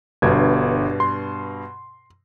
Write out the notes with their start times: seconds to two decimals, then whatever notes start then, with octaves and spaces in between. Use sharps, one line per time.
0.22 G1 G2 B2 G#6
1.00 C6